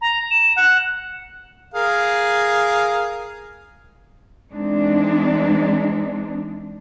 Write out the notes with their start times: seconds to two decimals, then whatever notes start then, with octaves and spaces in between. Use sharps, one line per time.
0.01 A#5
0.31 E7
0.56 F#5
1.74 G#4 A#4 F5
4.52 E3 G#3 C4 D4 D#4